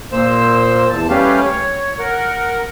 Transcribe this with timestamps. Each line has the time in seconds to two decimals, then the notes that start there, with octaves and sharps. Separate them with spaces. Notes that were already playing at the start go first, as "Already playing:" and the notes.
0.12 A#2 A#3 C5 E6
0.90 E2 A5
1.10 G3 A3 C#4 G4 B4 F5
1.44 C#5
1.99 A#4 F#5